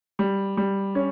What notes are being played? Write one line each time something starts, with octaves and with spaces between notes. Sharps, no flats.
G3
G3
C#4